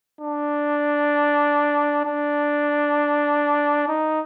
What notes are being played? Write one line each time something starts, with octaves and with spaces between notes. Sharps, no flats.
D4
D4
D#4